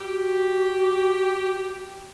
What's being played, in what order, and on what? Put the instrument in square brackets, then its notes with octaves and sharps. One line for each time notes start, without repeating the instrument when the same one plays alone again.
[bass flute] F#4 [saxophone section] G4